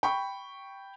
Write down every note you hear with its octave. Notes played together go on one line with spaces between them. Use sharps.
G5 B5 C#6